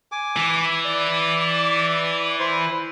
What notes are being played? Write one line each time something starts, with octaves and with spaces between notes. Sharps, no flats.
G#5 D6
E3
D5
E4 C5 C6